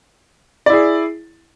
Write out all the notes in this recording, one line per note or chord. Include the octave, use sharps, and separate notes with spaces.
E4 G#4 D5